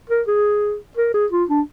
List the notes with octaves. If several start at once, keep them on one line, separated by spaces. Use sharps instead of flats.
A#4
G#4
A#4
G#4
F4
D4